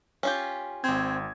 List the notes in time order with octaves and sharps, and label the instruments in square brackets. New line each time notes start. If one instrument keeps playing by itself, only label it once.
[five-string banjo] C#4 F4 G4
[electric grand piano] G#1 G#6 [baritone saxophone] C4